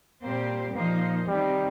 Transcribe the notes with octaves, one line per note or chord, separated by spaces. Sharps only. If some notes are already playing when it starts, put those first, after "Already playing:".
A#2 G3 A#3 C4 G4 C5
A#2 F3 A#3 D#4 C5
C3 D#3 G3 C4 D#4